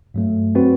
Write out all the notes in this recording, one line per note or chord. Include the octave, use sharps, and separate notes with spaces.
G2 F#3 A3
F#3 C4 F#4 B4